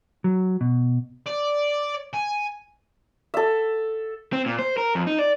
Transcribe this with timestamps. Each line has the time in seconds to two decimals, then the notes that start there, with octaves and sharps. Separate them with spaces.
0.24 F#3
0.61 B2
1.27 D5
2.14 G#5
3.34 A4 E5
4.33 C4
4.46 A#2
4.59 C5
4.77 A#4
4.95 F2
5.07 D#4
5.19 D5